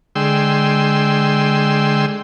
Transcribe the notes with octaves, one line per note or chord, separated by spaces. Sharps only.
D3 G#3 G5 C6 E6